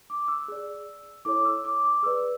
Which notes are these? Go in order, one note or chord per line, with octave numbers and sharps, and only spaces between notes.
D6
E6
G#4 D5
E4 A4 C#5 D6
E6
D6
D6
G#4 B4 D5 E6